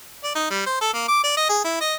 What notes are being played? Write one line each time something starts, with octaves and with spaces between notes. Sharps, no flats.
D5
D#4
G3
C5
A4
A#3
D6
D5
D#5
G#4
E4
D#5